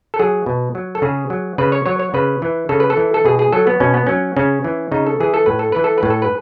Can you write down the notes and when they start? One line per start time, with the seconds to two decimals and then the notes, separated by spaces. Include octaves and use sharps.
0.14 A4
0.19 F#3 G#4
0.46 B2
0.75 F#3
0.95 A4
1.02 C#3 G#4
1.30 F#3
1.58 C#3 B4
1.72 C#5
1.86 F#3 C#5
1.99 C#5
2.14 C#3 B4
2.42 E3
2.69 C#3 A4
2.80 B4
2.90 A4
2.97 E3
3.14 A4
3.25 B2 G#4
3.39 G#4
3.53 F#3 A4
3.67 B3
3.80 B2 C#4
3.94 B3
4.07 F#3 C#4
4.37 C#3 C#4
4.64 E3
4.92 C#3 D#4
5.07 A4
5.20 E3 G#4
5.34 A4
5.46 A2 B4
5.59 A4
5.72 E3 B4
5.84 A4
5.98 B4
6.03 A2
6.10 A4
6.22 B4